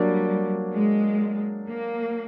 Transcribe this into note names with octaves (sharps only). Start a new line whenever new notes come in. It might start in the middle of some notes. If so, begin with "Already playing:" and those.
Already playing: F#3 G3 A#3 D4
G#3
A#3